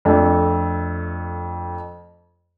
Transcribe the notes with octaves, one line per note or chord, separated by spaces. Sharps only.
F2 A3 D4